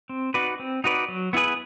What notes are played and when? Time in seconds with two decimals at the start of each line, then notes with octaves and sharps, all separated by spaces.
0.09 C4
0.34 D#4 F#4 B4 D5
0.60 C4
0.84 D#4 F#4 B4 D5
1.09 F#3
1.33 B3 E4 G#4 B4